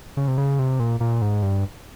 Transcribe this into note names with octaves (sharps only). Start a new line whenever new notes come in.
C#3
C3
C#3
C3
A#2
A#2
G#2
G2